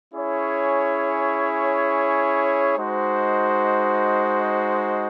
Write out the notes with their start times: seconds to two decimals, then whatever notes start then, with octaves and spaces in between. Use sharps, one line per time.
0.13 C#4 E4 G#4 C#5
2.76 G#3 D#4 F#4 C5